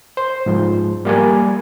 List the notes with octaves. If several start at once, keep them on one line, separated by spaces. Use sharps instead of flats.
C5
G#2 F3
G3 A#3 D5 G#5